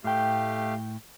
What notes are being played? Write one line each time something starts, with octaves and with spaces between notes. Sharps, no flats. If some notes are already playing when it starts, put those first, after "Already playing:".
A2 A3 G4 F5 G5